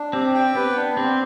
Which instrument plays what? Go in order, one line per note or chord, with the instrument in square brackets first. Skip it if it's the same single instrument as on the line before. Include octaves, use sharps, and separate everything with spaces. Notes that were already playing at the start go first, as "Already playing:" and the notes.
Already playing: [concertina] D4
[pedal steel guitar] C4 [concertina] G4
[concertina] G5
[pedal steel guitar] B3 [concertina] B4
[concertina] D4
[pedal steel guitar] C4 [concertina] G4